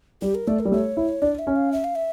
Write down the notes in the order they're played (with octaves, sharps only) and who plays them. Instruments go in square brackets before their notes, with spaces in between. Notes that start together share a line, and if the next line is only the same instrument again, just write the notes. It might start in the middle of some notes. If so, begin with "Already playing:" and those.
[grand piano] G3 [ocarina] G4
[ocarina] A#4
[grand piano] A3 [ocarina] D5
[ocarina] A#4
[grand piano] G3
[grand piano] A3 [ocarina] C#5
[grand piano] E4
[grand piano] D4 [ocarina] D5
[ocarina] E5
[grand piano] C#4
[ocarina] F5
E5
F5
E5